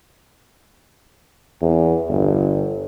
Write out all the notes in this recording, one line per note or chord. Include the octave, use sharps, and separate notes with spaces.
E2
G1